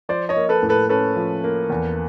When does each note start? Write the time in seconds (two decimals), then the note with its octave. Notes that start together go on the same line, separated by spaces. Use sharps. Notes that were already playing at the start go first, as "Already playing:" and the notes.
0.09 F3 C5 D5
0.29 C#5 D#5
0.36 A#3
0.49 A4 B4
0.63 A2
0.69 A4 B4
0.89 C#4 A4 B4
1.16 F3
1.44 A#3
1.70 E2